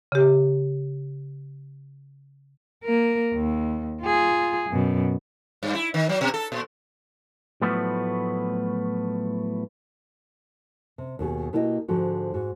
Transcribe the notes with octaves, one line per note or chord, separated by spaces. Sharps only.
C#3 G4
A#3 A#4
D#2
F4 G#4
F#2 B2
G2
E4
D#3
F#3
B2
A4
A#2
A2 F3 F#3 A3 B3
C3
D#2 B2 G#4
B2 A#3 E4 G4 C#5 D#5
G#2 D3 F3 F#4
G#2 F#4